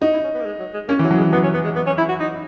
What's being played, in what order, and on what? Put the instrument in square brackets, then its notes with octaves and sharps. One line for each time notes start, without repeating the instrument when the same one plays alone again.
[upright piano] D#4 [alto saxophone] F#4
[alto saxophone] E4
C#4
B3
A#3
G#3
F#3
G#3
[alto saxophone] A#3 [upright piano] C#4
[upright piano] E3 [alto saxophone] F#3
[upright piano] F#3
[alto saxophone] G#3
[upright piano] E3
[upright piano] F#3 [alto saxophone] B3
[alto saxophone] C#4
B3
G#3
B3
C#4
E4
F#4
D#4